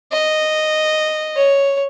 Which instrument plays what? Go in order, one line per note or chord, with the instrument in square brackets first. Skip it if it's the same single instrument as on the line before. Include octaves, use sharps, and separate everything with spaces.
[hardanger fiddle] D#5
C#5